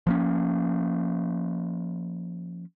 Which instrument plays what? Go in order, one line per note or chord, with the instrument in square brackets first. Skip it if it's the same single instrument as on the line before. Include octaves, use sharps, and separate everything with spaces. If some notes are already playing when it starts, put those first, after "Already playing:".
[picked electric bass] F3 A#3 C#4